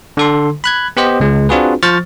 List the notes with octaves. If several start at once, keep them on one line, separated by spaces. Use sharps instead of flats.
D3 A4 C6
B5 F#6 G#6
B3 G4 C5 D#5
C#2 G#3
C4 D4 F4 F#4 G#4 B4
F3 C5 C#6 F6 A6